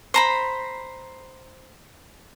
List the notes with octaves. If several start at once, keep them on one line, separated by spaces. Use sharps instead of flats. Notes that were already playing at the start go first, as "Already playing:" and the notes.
C5 A#5 B5